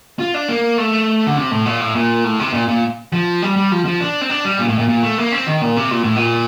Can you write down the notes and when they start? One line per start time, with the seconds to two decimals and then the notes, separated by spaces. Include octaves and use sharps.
0.19 F4
0.34 D4
0.49 A#3
0.78 A3
1.27 D3
1.37 C3
1.51 A2
1.66 A#2
1.80 A2
1.95 A#2
2.24 A2
2.39 C3
2.53 A#2
2.68 A#2
3.13 F3
3.42 G3
3.56 G3
3.72 F3
3.85 F3
4.01 D4
4.21 C4
4.30 D4
4.45 G3
4.59 A#2
4.68 A2
4.78 A#2
4.89 A#2
5.03 A3
5.18 A#3
5.32 C4
5.47 D#3
5.61 A#2
5.76 C3
5.91 A#2
6.04 A2
6.16 A#2